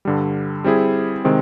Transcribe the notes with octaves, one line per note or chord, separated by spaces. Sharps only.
G2 D3 G3
G3 C4 E4 G#4
C3 D#3 G#3 C4